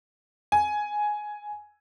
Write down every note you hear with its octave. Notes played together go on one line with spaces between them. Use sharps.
G#5